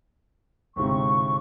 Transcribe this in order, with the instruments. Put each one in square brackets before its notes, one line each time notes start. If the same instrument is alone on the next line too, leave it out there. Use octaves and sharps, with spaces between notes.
[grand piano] G1 G#2 C3 [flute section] C#6